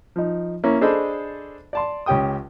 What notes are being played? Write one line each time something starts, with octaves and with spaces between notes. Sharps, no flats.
F3 D#4
A#3 C#4 E4
D4 G#4 A4 C5 D#5 B5
D5 A5 C6
C#2 C#4 G4 G5 D#6